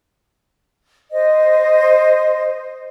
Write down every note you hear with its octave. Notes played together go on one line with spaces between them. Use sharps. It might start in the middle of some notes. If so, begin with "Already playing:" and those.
C5 D#5